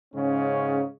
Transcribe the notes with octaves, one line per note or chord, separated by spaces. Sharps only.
G#2 C#3 C#4